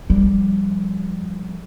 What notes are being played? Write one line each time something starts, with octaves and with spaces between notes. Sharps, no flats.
F3 G3